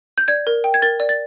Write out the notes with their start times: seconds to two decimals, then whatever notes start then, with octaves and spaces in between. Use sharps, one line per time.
0.18 G6
0.28 D5 G#6
0.47 A#4
0.64 G5
0.74 G#6
0.82 A#4 A6
1.00 D5
1.09 A6